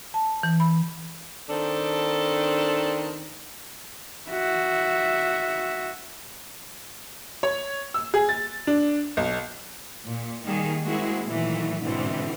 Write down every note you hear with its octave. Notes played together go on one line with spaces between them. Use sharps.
A5
E3
B5
D#3 C4 D4 A4
F#4 E5
C#5
E6
G#4
A6
D4
B1
A#2
D#3 G3 A#3 G#4
G#3 A#3 C4 E4 F#4 G#4
A#2 D#3 E3 F#3 A3
G#2 B2 D3 E3 C4